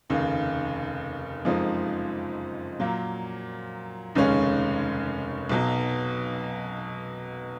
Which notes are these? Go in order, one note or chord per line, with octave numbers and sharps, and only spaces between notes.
F1 D#2 C#3
F#1 F2 F3 G#3 D#4
A#2 F#3 A#3
F1 D#2 C#3 G#3 C#4
B1 B2 F#3